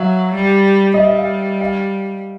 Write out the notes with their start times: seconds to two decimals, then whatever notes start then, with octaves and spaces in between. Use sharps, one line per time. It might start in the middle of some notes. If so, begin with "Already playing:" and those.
Already playing: F#3 E5 F5
0.34 G3
0.94 D#5
0.98 G3 E5
1.08 E5
1.19 F5
1.61 F5